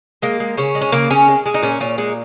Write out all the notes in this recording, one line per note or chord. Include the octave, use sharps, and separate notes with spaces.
G#3 A#3
G#3
C#3 C#4
G#3
C#4
C#3 A#3
C#3 C#4
G#3
G#3
D#4
A#2 C#4
A#2 C#4
G#3 D#4